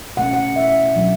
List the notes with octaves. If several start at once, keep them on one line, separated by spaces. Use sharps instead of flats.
B2 A3 C#4 F#5
F#5
E5
B2 F#3 A3 D4